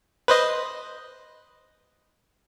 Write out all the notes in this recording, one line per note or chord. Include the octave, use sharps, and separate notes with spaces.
B4 C5 D#5